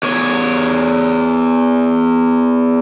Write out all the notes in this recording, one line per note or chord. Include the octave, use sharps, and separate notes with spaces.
E2 C#5